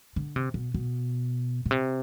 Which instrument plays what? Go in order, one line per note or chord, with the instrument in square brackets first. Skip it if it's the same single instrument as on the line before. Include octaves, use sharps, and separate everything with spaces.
[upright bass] D3
C3
B2
B2
B2
C3